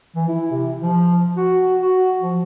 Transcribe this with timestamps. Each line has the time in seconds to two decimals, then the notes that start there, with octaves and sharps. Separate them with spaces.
0.15 E3
0.28 E4
0.51 C3
0.81 F3
1.37 F#4
1.81 F#4
2.20 F3